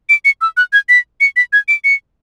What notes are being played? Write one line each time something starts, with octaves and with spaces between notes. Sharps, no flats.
D7
C#7
E6
F#6
G#6
B6
C#7
B6
G#6
D7
C#7